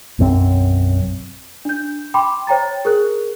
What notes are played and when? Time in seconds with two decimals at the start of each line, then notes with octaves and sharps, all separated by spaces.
0.19 B1 F#2 C4
1.65 D4 G6
2.14 G5 B5 C6 D6
2.47 C5 C#5 G5 A#5 A6
2.85 G#4 A#4 F#6